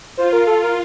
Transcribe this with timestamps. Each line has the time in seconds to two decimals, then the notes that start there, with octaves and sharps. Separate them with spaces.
0.17 F4 C5
0.33 A#4
0.47 A4
0.63 A#4